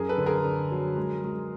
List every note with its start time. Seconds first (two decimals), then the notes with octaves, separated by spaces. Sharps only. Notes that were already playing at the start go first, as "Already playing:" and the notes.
Already playing: F#2 G#4 A#4
0.08 A4 B4
0.17 D3
0.26 G#4 A#4
0.45 D3
0.71 F#3
0.97 G#3
1.24 G#3